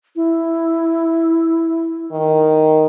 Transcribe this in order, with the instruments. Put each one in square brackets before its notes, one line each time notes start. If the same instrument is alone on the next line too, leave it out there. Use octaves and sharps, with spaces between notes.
[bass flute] E4
[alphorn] D#3